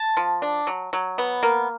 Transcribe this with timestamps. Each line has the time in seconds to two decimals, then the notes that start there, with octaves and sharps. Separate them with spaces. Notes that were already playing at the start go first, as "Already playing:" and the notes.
Already playing: A5
0.17 F3
0.42 D4
0.67 F#3
0.93 F#3
1.18 B3
1.43 A#3